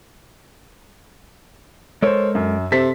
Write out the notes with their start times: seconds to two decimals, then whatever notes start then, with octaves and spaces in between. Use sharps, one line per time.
2.02 G#3 A4 A#4 C5 C#5
2.35 F#2
2.72 C3 C4 A4 B6